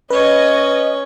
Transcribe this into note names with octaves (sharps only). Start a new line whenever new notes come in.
C#4 B4 C#5 D#5